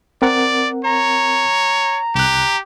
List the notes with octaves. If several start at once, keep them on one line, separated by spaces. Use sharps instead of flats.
C4 A#4 D5 F#5
C#5 A#5
C2 G4 F#6